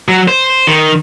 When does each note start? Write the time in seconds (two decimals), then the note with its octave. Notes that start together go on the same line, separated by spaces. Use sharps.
0.08 F#3
0.28 C5
0.67 D#3